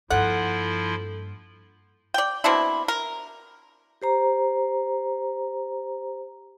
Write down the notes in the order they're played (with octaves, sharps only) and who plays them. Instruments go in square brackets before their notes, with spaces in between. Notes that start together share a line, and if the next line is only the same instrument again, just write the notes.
[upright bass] G2 A#3 [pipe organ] F3 E4 F4 [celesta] A4 [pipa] F#5
[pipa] D5 G5
B2 C4 D4 E4
A#4
[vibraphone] G4 C5 A#5